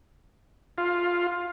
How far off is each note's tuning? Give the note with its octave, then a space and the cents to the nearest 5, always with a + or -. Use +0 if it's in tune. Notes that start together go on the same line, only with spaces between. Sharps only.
F4 +5